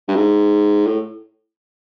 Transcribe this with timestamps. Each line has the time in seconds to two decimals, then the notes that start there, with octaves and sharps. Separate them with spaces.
0.08 G2
0.16 G#2
0.87 A2